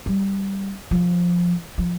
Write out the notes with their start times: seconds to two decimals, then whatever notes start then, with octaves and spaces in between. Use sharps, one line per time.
0.06 G3
0.91 F3
1.78 F3